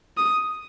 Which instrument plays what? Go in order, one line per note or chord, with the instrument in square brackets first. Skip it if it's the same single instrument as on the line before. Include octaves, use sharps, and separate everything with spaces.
[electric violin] D#6